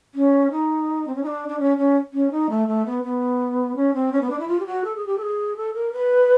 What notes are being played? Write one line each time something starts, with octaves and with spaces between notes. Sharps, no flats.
C#4
D#4
C4
C#4
D#4
D4
D4
C#4
C#4
C#4
D#4
A3
A3
B3
B3
C#4
C4
C#4
B3
D4
E4
F4
G4
F#4
A4
G#4
G4
A4
G#4
A4
A#4
B4